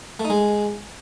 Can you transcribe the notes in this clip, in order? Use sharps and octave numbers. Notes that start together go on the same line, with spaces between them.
A3
D#4
G#3